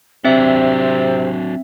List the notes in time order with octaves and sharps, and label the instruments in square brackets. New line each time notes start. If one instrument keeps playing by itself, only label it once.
[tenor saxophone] C3 [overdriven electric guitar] F#3 D4 [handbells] C4 E5 [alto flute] C5